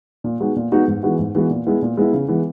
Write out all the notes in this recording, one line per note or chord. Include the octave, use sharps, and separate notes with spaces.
A#2
G#3 B3 D#4 F#4
A#2
G#3 B3 D#4 F#4
G#2
E3 G#3 B3 F#4
G#2
E3 G#3 B3 F#4
A#2
G#3 B3 E4
A#2
G#3 B3 E4
C#3
E3 G#3 B3